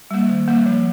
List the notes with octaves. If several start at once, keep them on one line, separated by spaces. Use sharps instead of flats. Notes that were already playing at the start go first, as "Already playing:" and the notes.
G3 A#3
D#3
G3 A#3
F3